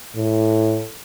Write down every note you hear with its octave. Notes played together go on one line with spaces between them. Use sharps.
A2